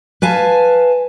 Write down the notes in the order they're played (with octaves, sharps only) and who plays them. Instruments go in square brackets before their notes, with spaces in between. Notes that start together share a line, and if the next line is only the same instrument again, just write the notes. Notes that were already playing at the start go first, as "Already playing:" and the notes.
[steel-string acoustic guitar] B4 F5 G#5 A5